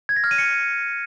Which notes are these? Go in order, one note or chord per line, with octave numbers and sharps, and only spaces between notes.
G#6
A#6
F6
D#7
C#7